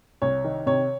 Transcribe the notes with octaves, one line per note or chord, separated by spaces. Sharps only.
C2 C#5
D#3
C3 C#5